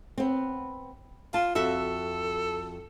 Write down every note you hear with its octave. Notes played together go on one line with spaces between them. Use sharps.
B3 C4
F4 A5
F2 F#4 A4 E5